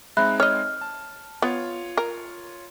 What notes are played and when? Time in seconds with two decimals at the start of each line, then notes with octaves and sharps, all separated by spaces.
0.17 G#3 C4 D#4 E5 B5 F#6
0.40 C#5 D#5 F6
0.81 A5
1.42 B3 F4 C#5
1.97 A#4